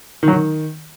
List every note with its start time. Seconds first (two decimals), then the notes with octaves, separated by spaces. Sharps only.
0.23 D#3
0.28 F#3
0.33 D#3